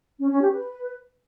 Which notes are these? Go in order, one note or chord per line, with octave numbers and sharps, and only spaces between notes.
C#4
C#4
G4
B4